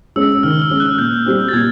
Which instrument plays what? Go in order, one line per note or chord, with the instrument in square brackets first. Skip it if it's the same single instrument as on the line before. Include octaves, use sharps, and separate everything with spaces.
[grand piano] G#3 C#4 [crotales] E6
[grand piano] D#3 [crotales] F6
[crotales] F6
[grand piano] G#3 C#4
[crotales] F#6
[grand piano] A#2 [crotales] G6
[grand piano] G3 C4
[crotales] A6
[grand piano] A#2 [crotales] G#6